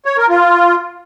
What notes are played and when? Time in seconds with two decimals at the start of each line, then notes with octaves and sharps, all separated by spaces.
0.06 C#5
0.17 A#4
0.29 F4